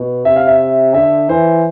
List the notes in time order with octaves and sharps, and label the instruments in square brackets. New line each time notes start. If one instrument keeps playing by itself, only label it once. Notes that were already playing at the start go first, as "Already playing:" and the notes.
Already playing: [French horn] B2
[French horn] C3 [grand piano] E5
[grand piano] F5
E5
[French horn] D3 [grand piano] E5
[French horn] E3 [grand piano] C5